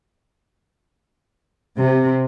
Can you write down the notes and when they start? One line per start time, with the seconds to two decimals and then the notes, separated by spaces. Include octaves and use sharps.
1.77 C3